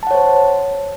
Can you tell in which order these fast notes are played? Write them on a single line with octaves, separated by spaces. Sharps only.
A5 F#5 C#5 C5